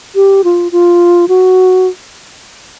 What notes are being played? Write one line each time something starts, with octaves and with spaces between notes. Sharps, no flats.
G4
F4
F4
F#4